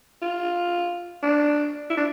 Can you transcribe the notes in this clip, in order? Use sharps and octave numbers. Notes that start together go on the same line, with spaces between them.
F4
D4
E4
D4